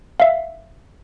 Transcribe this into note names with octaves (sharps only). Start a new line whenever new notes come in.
E5 F5